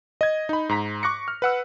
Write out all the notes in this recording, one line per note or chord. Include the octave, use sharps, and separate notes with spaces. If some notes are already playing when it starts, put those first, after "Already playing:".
D#5 G#6
D#4 B5
G#2 A#5 B6
C#6 D6 F#6 A#6 C#7
F6
B4 F#5 E6